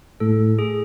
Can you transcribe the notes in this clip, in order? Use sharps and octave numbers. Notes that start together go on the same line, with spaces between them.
A2 A4
G#4